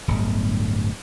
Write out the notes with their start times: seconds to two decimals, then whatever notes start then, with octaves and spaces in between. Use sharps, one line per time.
0.08 D1 G1